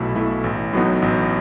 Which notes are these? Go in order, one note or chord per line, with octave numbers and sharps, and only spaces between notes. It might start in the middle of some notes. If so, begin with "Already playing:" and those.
Already playing: B1 B2 A3 E4
B2 A3 E4
A1
A2 F#3 B3 D#4
A1